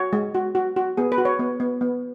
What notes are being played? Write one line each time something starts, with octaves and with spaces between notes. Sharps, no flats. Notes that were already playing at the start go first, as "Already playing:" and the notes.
Already playing: F#4 C#5
G#3
F#4
F#4
F#4
B3 G#4
B4
F#4
C#5
B3
B3
B3